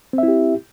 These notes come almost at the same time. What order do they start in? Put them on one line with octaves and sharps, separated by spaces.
C4 E5 E4 G4